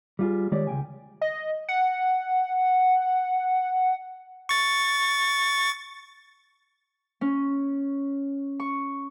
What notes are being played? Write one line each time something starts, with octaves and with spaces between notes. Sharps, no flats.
G3 F4 G#4
D#3 G#3 G4 C#5 D5
C#2 A#3 G5 G#5
D#5
F#5
C#6 A6
C#4
C#6